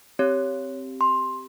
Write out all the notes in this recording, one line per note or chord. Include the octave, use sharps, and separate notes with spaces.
C4 G4 C#5
C6